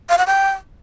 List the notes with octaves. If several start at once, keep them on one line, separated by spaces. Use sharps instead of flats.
F5
F#5
G5